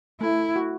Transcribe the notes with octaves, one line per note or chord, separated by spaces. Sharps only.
A3 E4
F#4